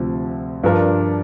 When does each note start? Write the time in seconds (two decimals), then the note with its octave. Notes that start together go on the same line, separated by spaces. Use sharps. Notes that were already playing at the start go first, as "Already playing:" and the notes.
Already playing: D2 C3 F3
0.63 G2 F3 D4 A#4